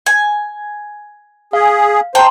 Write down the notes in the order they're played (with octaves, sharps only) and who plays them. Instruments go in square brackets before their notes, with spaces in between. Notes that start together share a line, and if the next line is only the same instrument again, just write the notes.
[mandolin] G#5
[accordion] G#4 [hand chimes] F5
[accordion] C5 [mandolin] G5 [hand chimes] A5 A#5 C6